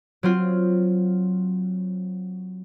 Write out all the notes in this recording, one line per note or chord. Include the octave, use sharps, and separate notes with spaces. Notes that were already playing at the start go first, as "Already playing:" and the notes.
F#3 C4 F4